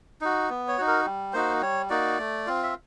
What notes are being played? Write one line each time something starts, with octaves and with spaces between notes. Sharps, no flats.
D#4 F#4
B3
C#5
D#4 F#4
A#4
G3
A#3 D#4 F#4 C5
G3 C#5
A#3 D#4 F#4 D5
A3
C4 F4
E5